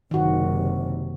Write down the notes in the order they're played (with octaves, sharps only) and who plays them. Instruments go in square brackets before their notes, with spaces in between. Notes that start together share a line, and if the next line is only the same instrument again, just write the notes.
[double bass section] F#1 C3 [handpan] D#3 F#4